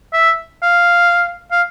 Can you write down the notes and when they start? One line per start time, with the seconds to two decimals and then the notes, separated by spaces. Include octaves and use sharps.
0.13 E5
0.63 F5
1.51 F5